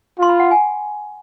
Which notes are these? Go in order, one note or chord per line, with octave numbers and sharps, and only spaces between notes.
F4 C6
B5
F#5
G#5